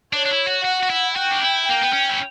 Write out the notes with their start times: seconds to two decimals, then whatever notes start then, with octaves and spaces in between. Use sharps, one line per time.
0.13 D4 C#5
0.26 D4
0.31 E4
0.47 F#4
0.64 F#4 F#5
0.83 F#4
0.90 E4
1.16 F#4 G5
1.31 D4
1.41 E4
1.67 A#3 G5
1.81 B3
1.93 C#4
2.09 E4